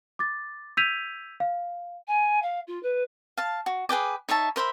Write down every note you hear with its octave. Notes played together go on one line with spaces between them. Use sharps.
D6 A6
E6 G6 G#6 B6 D#7 F7
F5
G#5
F5
F4
B4
F5 A5
F#4
G#4 B4 G5 D6
D#4 C#5 E5 A5
A#4 C5 E5 B5